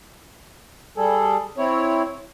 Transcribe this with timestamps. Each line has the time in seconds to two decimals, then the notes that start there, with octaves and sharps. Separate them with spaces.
0.97 G3 G#4 A4
1.58 C4 E4 C#5